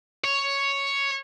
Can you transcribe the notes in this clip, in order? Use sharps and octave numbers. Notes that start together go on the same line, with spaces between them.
C#5